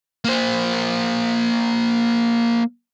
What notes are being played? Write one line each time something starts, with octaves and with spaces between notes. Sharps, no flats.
A#3 C5